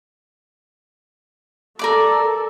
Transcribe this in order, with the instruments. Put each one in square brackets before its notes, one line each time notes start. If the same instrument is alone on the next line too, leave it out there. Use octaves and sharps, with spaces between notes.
[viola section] A4 [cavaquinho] A#4 D5 D6